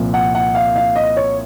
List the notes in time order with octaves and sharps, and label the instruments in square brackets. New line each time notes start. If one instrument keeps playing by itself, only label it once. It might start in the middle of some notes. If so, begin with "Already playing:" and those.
Already playing: [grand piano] C2 A#2 F3
F#5
F#5
F5
F5
D#5
C#5